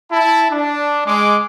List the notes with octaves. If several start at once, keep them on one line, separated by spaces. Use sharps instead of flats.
E4 A5
D4
G#3 D6